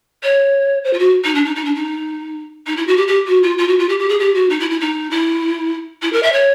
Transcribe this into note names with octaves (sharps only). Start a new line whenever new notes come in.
C#5
C5
F4
F#4
D#4
D4
D#4
D#4
D4
D#4
D#4
E4
F#4
G4
G4
F#4
F4
F4
F#4
F4
G4
G4
G#4
G4
F#4
D#4
E4
E4
D#4
E4
E4
A#4
E5
C#5